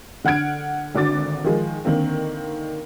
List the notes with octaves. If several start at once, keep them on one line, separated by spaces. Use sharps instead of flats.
D3 F#5 F6 G#6 D7
G#1 D3 F#4 D6 A6
D#3 F3 G#3
D3 D#3 A#3 C4